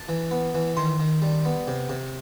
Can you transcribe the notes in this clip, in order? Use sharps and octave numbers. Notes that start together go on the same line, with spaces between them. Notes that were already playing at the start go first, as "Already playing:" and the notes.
Already playing: A5
E3
B3
E3
D#3 C6
D#3
G3
B3
C3
C3